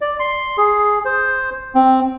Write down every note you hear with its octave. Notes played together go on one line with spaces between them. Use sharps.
D5
C6
G#4
C5
C4